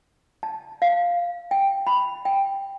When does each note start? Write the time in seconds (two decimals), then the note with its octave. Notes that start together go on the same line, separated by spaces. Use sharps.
0.43 A5
0.82 F5
1.51 G5
1.87 B5
2.25 G5